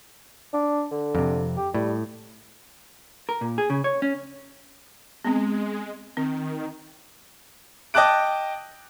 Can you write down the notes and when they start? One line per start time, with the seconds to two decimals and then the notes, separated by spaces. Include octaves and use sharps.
0.54 D4
0.91 D3
1.15 F2 C3
1.57 G4
1.74 A2 G3
3.29 A#4
3.41 A#2
3.58 G#4
3.70 C#3
3.84 C#5
4.02 C#4
5.25 G#3 B3 C4
6.17 D#3 C4
7.94 D#5 G5 A5 D6 F#6 D7